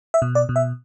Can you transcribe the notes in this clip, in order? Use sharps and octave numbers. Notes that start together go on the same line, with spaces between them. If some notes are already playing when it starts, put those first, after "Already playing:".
E5
B2
D5
B2
E5